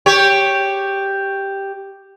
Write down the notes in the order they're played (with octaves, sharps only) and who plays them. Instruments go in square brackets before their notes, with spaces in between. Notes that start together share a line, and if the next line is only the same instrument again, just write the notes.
[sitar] G4 C#5